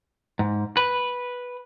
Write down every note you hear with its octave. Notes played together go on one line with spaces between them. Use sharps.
G#2
B4